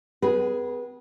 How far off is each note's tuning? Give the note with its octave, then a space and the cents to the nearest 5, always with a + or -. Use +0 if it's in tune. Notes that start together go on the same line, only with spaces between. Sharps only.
B3 +40 G#4 +0 B4 -25